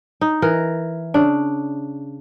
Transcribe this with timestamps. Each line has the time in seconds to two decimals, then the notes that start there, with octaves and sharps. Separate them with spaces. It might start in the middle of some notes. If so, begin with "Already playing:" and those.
0.21 D#4
0.42 E3 A#4
1.14 C#3 D4